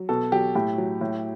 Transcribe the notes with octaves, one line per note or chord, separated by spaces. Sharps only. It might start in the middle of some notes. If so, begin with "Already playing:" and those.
Already playing: F#3
B2 A4
F#3 G4
A2 G4
F#3
A2